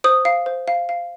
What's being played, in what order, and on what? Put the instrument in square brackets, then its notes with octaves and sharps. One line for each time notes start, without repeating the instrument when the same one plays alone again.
[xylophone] C5 D#6
F5
C5
F5
F5